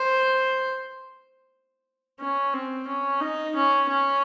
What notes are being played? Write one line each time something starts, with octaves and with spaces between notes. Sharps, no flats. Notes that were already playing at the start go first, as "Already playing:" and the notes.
Already playing: C5
C#4
C4
C#4
D#4
C#4
C#4